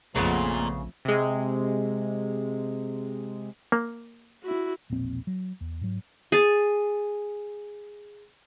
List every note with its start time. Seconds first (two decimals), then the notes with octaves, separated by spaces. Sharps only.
0.16 A#1 F2 A#2 C#3 A3 B3
1.05 C3 G#3
3.72 A#3
4.43 E4 F#4
4.90 E1 A#1 A#2 C4
5.27 F#3
5.61 E2
5.81 G#2 F#3
6.32 G#4 A5